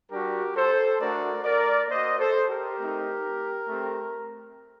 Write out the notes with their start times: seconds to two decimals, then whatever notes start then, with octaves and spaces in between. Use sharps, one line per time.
0.11 G3 D4 F#4 G4 A#4
0.55 A4 C5
0.99 A3 D4 F#4 A#4 D5
1.44 A#4 D5
1.88 A#3 F#4 C5 D#5
2.19 A4 C5
2.48 G4 A#4
2.79 A3 C4 D#4
3.67 A3 C4 G4